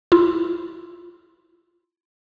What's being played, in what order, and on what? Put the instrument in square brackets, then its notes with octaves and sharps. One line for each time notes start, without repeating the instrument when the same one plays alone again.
[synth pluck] E4 F4